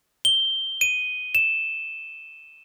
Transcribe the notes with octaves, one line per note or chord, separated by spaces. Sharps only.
G7
D#7
E7